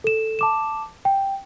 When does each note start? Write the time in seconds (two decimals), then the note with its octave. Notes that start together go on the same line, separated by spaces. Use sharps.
0.04 A4 E7
0.39 A5 D6 E7
1.05 G5